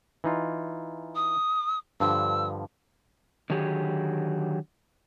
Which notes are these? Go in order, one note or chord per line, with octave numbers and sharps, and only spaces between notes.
E3 D#4 F4
D#6
G2 D3 F3 E6
D3 D#3 F#3 G4 G#4